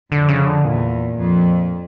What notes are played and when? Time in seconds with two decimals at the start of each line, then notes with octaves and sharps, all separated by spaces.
0.11 F2 D3
0.29 C#3
0.46 D3
0.64 E2 A#2
1.17 F2